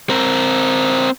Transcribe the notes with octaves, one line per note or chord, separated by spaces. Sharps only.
C4 A#4